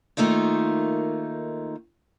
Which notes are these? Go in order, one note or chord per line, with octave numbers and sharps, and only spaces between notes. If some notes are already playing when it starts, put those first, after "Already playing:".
D#3 A3 A#3 D#4 F4